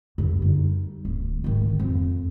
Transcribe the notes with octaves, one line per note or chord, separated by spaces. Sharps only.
F#2 D3
G3 D#4
D1
G#2 D#3
F2